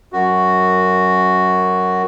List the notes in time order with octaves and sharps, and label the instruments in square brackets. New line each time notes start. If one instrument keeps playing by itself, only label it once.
[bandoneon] F#2 F#4